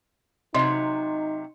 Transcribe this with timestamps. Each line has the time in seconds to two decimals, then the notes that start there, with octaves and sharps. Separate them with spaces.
0.54 C3 F#3 D#4 D#5 C6